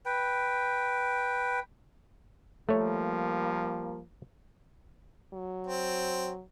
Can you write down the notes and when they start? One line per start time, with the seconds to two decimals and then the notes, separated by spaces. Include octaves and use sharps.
0.06 B4 G5
2.69 F3 G3 A3 A#3 C#5
5.34 F#3
5.67 C4